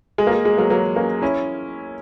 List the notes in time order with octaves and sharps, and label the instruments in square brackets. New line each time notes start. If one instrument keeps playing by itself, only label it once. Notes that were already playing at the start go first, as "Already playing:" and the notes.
[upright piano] G#3
A#3
G#3
G#3
F#3 A#3
F#3 A#3
A#3 C#4
C#4 E4